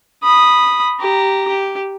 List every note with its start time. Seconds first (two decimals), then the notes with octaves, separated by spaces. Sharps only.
0.23 B5 D#6
1.00 G4 A#5
1.48 G4